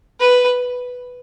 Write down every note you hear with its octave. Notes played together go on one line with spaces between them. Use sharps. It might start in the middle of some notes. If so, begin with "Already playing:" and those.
B4